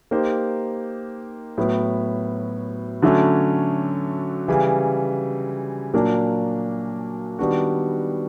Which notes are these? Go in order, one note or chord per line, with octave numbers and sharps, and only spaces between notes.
A#3 D#4 G4 C5
A2 F#3 B3
D3 F#3 A3 C#4
C#3 E3 G3
A#2 F#3 A#3 D4
D#3 G3 B3 D4 F#4